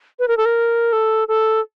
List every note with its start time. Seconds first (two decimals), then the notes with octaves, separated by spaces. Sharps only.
0.19 B4
0.28 A#4
0.37 A4
0.45 A#4
0.93 A4
1.28 A4